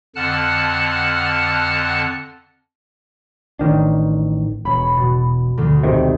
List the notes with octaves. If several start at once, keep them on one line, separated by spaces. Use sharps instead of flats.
F2 D3 F#5 A5 F6 F#6
A1 D#3 D4
E1 C#5 B5
B2
D2 D3
G#1 C3 D#3